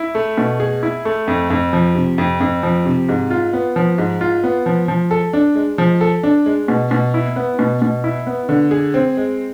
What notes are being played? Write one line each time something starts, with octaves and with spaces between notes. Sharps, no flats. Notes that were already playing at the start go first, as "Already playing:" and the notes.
Already playing: E4
A3
B2
G#4
E4
A3
F2
F2
F3
C3
F2
F2
F3
C3
G#2
F4
B3
F3
G#2
F4
B3
F3
F3
A4
D4
G#3
F3
A4
D4
G#3
B2
B2
E4
B3
B2
B2
E4
B3
D3
G#4
C4
G#3